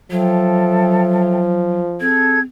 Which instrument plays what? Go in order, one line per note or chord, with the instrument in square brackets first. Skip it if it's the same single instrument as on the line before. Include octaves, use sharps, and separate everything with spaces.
[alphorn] F3 [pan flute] F#3 [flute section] A4 E5 G5
[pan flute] C4 [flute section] G#4 A4 G#6